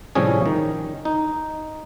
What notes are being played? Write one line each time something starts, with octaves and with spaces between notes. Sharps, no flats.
A2 C3 F3 G3 C#4 G#4
D#3
D#4